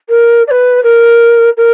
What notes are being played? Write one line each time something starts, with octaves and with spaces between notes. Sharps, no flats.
A#4
D5
B4
A#4
A#4